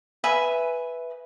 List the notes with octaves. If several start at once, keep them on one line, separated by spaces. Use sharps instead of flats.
B4 E5 G#5 B5